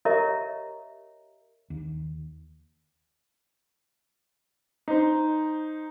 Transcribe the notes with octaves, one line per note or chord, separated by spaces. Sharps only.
G4 A#4 C#5 D#5 E5 A#5
D#2
D#4 C5